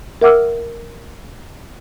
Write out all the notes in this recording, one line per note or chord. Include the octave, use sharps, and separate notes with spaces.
A#4 E5 F#5 D6 E6 F6